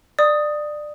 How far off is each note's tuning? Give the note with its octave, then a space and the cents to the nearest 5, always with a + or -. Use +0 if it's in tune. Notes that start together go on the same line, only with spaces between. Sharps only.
D5 +20 D#6 +0